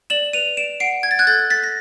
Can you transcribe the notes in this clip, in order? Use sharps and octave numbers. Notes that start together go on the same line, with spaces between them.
D5 E7 F#7
B4 D#7 F7
D5 D7 E7
F#5 C7 D7
F#5 G#6
A6
F#6 G#6
A4 G6 A6
A4 A6 B6
A#6